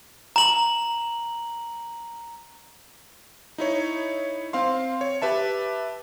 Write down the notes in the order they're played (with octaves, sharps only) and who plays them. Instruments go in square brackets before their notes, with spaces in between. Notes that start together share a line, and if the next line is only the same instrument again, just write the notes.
[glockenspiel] A#5 F#7
[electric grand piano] D#4 E4 C#5
C4 F5 C6
C#5
G4 B4 E5 A5